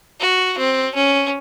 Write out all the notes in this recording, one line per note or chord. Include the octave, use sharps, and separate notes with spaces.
F#4
C4
C#4